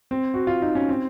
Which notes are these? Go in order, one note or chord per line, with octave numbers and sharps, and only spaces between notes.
C4
F#4
F4
D#4
C#4
C4